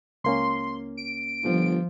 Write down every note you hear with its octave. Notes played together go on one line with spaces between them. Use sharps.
C#2 A#3 C#4 C6
D7
G1 F3